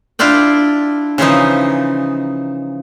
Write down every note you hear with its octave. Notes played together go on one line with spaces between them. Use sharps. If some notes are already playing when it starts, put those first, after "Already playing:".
D4 E4 F4 D5 G5
C#3 E3 F3 D#4